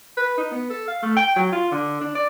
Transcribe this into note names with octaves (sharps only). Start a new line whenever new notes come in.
B4
D#4
B3
A4
F5
A3
G5
F#3
F4
D3
D4
D5